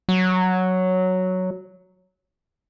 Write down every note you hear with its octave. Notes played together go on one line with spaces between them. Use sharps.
F#3